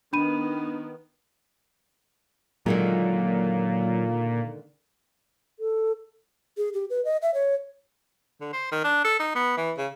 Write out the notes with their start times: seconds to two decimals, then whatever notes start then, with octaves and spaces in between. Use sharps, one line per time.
0.13 D#3 B3 D4 B5 D#7
2.66 A#2 D3 D#3 F#3 G#3 A#3
5.59 A4
6.57 G#4
6.74 G4
6.90 B4
7.05 D#5
7.22 E5
7.34 C#5
8.41 D3
8.53 C5
8.72 D#3
8.84 D4
9.04 A4
9.20 D#4
9.35 B3
9.57 E3
9.77 C#3